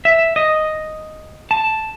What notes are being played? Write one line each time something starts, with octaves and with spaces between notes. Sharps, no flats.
E5
D#5
A5